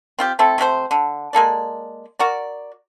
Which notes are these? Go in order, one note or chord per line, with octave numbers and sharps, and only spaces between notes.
C4 F4 G4
A3 C4 E4 A4
C3 A3 C#4 C5
D3
G#3 A#3 A4 D5
F#4 A#4 D5